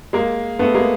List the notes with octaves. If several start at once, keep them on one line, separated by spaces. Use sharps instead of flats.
G#3 A#3
A3 B3
G#3 A#3